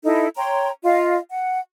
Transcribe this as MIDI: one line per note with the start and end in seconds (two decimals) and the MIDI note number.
0.04 0.27 63
0.04 0.27 64
0.04 0.27 69
0.37 0.69 73
0.37 0.69 79
0.37 0.69 82
0.37 0.69 84
0.84 1.18 65
0.84 1.18 75
0.84 1.18 77
1.30 1.59 78